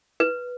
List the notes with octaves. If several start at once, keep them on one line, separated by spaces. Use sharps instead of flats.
B4